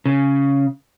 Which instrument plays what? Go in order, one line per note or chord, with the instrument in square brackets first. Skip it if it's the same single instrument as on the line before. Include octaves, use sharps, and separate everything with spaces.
[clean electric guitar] C#3